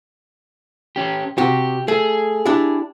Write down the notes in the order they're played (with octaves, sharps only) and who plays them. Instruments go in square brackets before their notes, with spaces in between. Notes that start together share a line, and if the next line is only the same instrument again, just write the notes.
[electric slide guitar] C#4 G4
[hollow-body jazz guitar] C3 F#4 [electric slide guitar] G4
[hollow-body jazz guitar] A3 [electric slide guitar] G#4
[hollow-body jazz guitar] D4 E4 G4